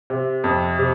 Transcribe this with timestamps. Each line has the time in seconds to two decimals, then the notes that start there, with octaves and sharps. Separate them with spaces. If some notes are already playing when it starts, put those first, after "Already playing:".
0.10 C3
0.44 F2
0.78 C3